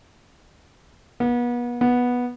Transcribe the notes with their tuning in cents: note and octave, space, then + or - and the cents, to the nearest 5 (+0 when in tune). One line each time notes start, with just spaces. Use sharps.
B3 -35
B3 -10